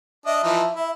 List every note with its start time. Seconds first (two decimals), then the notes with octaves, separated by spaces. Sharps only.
0.26 D4 D#5 E5
0.43 E3 F3 D#4
0.74 E4